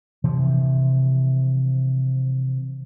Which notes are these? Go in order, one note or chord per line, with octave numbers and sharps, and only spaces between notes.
C3 E3 F3